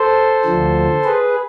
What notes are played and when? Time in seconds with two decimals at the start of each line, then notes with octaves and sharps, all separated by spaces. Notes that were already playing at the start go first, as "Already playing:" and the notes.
Already playing: A4 C5
0.45 D2 D3 F3
1.05 G#4 B4